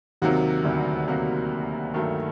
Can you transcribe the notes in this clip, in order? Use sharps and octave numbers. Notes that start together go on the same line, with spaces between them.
D#2 C3 D#3 F#3 A#3 F#4
D2 D3
C3 F#3 A#3 F#4
G2 D#3 F#3 A3